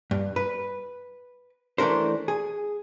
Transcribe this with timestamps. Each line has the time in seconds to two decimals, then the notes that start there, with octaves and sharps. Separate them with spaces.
0.11 G2
0.36 B4
1.78 E3 A3 D4 A#4 C5
2.28 G#4